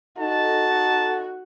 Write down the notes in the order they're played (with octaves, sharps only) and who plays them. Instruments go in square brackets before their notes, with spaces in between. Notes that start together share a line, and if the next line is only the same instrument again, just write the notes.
[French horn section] D#4 A4 [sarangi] F#4 [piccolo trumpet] A5